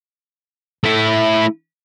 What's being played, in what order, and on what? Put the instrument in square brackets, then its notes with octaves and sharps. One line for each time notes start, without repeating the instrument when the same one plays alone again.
[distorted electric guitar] A3 E4